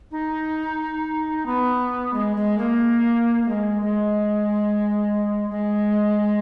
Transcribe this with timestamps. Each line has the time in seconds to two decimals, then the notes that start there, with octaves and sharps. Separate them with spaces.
0.11 D#4
1.46 B3
2.13 G#3
2.36 G#3
2.58 A#3
3.43 A#3
3.48 G#3
3.82 G#3
5.50 G#3